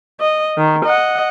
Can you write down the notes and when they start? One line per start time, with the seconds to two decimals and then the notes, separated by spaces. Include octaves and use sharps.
0.20 D#5
0.57 D#3
0.86 D#5 F#5